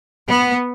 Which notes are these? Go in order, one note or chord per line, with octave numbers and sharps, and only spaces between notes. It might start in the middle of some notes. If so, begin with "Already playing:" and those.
B3